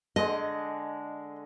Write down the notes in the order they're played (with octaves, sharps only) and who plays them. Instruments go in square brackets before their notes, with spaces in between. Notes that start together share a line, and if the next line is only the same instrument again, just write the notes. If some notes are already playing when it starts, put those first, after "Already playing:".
[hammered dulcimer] D3 G#3 [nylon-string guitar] D#5